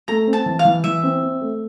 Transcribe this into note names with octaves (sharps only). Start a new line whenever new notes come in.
A3 A#5
C4
A5
E3
F5
E3
E3 E5
C4
C4
A3